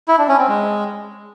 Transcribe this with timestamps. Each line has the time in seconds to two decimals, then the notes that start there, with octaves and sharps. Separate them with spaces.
0.08 E4
0.18 D4
0.28 C#4
0.38 C4
0.48 G#3